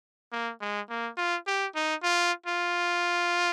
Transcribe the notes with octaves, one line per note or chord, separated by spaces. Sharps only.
A#3
G#3
A#3
F4
G4
D#4
F4
F4